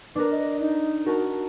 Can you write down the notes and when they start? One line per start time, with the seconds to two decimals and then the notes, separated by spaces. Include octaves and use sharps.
0.15 D4 A#4 B4
0.31 D#5
0.60 D#4
1.06 F#4 A#4 A5